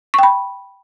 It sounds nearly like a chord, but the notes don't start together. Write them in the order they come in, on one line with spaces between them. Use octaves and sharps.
C#6 G5 B5